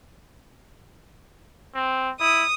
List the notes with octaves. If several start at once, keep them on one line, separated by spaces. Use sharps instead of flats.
C4
E4 D#6